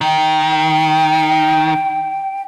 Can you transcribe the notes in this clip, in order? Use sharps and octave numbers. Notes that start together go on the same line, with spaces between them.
D#3 G5